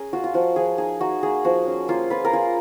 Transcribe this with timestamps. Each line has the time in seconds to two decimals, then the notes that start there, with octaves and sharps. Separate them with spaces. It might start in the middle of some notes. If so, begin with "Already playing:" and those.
Already playing: C#4 G#4 A#4
0.13 F4 F#4
0.24 F4
0.34 F3 F#4
0.56 F3 G#4
0.78 D#4 G#4
1.00 D#4 F#4
1.23 A#3 G#4
1.44 F3 F#4
1.67 C#4
1.89 A#3 F4
2.10 F4 B4
2.25 A#4
2.33 F4 G#4